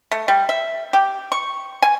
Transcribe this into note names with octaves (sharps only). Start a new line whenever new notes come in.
A3
G3
E5
G4
C#6
G#5